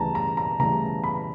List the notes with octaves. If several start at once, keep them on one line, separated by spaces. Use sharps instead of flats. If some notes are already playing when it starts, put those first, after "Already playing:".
Already playing: D2 C#3 E3 G3 A5 A#5
A#5
A#5
D2 C#3 E3 G3 A#5
B5